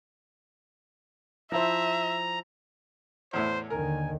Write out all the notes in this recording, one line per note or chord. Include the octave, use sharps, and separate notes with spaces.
F3 E4 C5 E5 A#5
E2 A2 E4 C5
D#2 D3 D#3 A#4 G#5